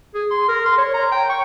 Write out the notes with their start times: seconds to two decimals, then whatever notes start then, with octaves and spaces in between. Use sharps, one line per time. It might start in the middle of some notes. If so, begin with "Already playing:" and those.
0.15 G#4
0.31 C6
0.49 A#4
0.66 C6
0.78 C#5
0.94 A#5
1.12 G5
1.30 C#6